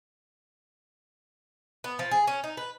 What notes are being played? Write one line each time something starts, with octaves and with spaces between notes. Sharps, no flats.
B3
F3
G#4
C#4
D#4
B4